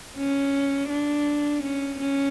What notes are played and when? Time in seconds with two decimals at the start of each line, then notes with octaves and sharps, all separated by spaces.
0.17 C#4
0.89 D4
1.63 C#4
2.00 C#4